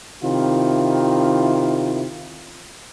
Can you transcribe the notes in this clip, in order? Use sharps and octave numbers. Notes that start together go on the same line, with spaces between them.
C3 D#3 E4 F4